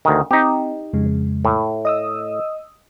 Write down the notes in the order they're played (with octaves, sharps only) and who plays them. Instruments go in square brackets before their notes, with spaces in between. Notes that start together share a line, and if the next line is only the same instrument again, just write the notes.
[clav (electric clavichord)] D2 D#3
[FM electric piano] C4 [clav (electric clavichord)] D#4 G4
[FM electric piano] F2 C#3 G#3
[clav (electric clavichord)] A2
[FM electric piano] D#5 D#6 E6